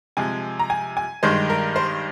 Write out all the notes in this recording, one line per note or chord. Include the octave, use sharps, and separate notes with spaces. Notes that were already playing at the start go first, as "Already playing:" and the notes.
C3 F3 G#3 G#5
A#5
G#5
G#5
G2 D#3 G#3 C5
A#4
C5